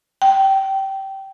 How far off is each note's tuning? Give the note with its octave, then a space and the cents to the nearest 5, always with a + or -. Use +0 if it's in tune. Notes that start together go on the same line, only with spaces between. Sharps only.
G5 -20